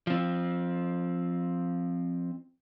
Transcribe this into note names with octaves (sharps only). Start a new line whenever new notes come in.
F3 C4